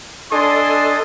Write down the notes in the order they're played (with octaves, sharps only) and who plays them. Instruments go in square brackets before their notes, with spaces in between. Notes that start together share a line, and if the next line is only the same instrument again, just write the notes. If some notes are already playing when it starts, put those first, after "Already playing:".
[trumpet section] D4 G#5 C6 [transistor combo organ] A4 D#5